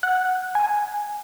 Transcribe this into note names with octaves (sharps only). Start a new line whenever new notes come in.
F#5
G#5